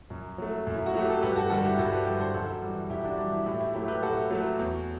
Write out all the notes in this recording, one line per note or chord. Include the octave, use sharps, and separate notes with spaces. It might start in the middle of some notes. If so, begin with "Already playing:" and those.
F#2
F#3 A3
F#2
E4
F#4
F#3 A3 G4
A4
G2 G4 B4
F#4 A4
D3 G3 F#4 A4
E4 G4
G2 F#4 A4
G4 B4
D3 G3 G4 B4
A4 C5
F#2 F#4 A4
E3 G3
F#2 E4 G4
D4 F#4
E3 G3 D4
E4
A2 E4 G4
E4
F#3 A3 E4 G4
G4 B4
A2 F#4 A4
F#3 A3
E2